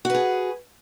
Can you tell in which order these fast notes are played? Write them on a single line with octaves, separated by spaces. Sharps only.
F#4 B4 G#4